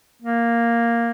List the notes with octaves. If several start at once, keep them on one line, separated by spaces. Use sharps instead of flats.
A#3